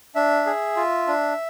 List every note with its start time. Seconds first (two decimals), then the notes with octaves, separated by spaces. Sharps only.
0.15 D4 E5
0.46 G#4
0.76 F4
1.08 D4